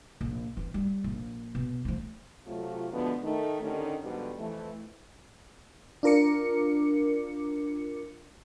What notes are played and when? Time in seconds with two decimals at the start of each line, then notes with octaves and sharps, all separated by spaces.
0.21 A#1
0.57 E3 C4
0.74 G3
1.04 A#1
1.55 B2
1.85 F3 A3
2.47 C3 F#3 A3 F4
2.92 B2 D3 F3 G#3 A3 B3
3.24 D#3 A3 D#4
3.63 D3 D#3 C#4 D#4 G4 A4
4.03 G#2 B2 D3 F3 G3
4.39 F2 E3 A3
6.03 D4 F4 A#4 D6 C#7